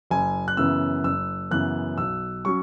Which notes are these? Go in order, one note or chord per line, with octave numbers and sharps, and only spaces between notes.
F#1 G#5
F#6
F#2 C#3 E3 B3 E6
F#1 E6
F#2 C#3 E3 B3 F#6
B1 E6
F#3 C#4 C#6